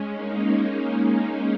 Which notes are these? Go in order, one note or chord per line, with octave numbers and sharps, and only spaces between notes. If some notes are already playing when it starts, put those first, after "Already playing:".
Already playing: G#3 C#4
A#3 D#4